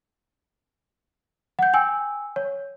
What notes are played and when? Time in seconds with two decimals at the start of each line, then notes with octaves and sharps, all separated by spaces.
1.59 F#5 G6
1.74 G5 G#5 E6
2.36 C#5